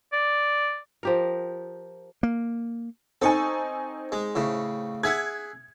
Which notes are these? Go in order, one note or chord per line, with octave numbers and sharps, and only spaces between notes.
D5
F3 G4 A#4
A#3
C4 D#4 A4 G#5 C#6
G#3
A2 C#3
G#4 E5 F#5 G#6